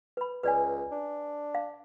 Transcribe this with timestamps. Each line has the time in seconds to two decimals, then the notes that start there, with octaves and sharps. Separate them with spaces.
0.17 B4 B5
0.43 C#2 B4 D5 G#5
0.92 D4
1.55 F5